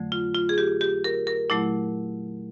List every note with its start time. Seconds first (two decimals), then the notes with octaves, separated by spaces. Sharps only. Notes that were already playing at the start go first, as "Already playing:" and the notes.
Already playing: F2 D3 F#3 A3
0.12 F4
0.35 F4
0.49 G#4
0.58 G4
0.81 G4
1.04 A#4
1.27 A#4
1.50 A#2 F#3 A3 E4